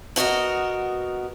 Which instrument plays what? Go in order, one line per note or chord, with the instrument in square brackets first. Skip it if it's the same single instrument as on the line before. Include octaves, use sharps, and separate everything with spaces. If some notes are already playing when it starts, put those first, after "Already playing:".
[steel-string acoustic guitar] B3 F#4 A#4 D#5